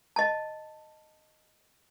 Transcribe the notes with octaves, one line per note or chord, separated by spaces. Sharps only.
D#5 A5